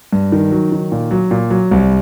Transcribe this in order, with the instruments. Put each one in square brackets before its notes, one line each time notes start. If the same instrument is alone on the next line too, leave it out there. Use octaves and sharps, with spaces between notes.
[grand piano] G2
D#3
F#3
D#3
A#2
F#3
A#2
F#3
C2